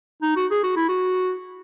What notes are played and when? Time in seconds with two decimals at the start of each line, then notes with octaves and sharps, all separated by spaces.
0.22 D#4
0.36 F#4
0.51 G#4
0.64 F#4
0.76 E4
0.89 F#4